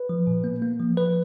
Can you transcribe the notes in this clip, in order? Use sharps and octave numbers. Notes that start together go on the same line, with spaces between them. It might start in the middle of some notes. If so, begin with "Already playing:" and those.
Already playing: B4
F3
A#2
A#3
A#3
F3
F3 B4